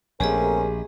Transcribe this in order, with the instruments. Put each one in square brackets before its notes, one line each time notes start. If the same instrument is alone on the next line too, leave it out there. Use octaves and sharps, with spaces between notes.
[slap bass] A#1 [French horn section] A3 C4 A#4 [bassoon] C#4 [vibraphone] G4 G#4 D#5